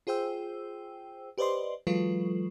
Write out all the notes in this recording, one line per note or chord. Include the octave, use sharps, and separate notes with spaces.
F4 G#4 C5 G5 E6
G4 B4 C5 D5 D#5 C6
E3 F#3 G#3 F4 A4 B4